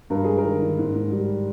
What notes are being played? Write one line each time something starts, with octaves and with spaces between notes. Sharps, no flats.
G2 A#4
G#3 G#4
A#4
D#3
D#3
G#2
G#2
G3